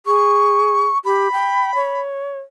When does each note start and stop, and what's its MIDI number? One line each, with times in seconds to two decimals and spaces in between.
0.06 0.85 68
0.06 0.98 85
1.05 1.28 67
1.05 2.01 83
1.32 1.74 79
1.75 2.39 73